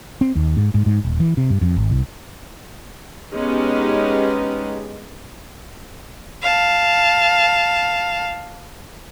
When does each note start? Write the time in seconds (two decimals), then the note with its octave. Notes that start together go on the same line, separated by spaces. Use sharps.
0.21 C4
0.36 D#2
0.57 G#2
0.74 G#2
0.86 G#2
1.05 D#1
1.20 E3
1.37 C3
1.50 G2
1.61 F2
1.76 G#1
1.91 C2
3.32 G#3 B3 C#4 D#4 G4
6.42 F5 A5